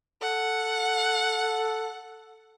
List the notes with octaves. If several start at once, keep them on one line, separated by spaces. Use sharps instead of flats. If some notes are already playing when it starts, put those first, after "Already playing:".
A4 F#5